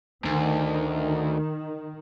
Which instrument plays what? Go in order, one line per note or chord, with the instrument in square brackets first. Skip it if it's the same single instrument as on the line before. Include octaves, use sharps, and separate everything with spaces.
[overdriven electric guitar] D2 [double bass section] D#3